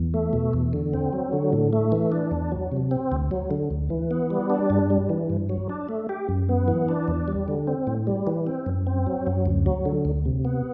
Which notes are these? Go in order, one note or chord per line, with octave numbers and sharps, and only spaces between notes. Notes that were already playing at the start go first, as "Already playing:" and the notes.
Already playing: E2
A3
B2
E2
D3
C4
F#3
D3
A2
A3
E3
D4
E2
F#3
C3
C4
D2
F#3
D3
D2
E3
B3
G3
D4
G2
G3
E3
G2
F#3
D4
A3
G4
F#2
B3
E3
D4
E2
G3
D3
C4
A2
G3
E3
C4
F#2
C4
F#3
F#2
D2
F#3
D3
D2
C3
B3